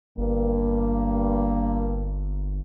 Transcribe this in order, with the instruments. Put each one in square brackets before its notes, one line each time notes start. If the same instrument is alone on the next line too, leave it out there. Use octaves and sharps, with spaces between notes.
[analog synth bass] G1 [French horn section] G2 A#3